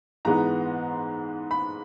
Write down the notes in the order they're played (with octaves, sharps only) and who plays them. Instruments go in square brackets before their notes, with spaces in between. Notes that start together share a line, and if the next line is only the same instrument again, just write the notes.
[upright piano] G#2 E3 G#3 B3 A#5
B5